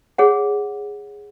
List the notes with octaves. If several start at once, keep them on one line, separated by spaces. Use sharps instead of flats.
G#4 C#5 F#5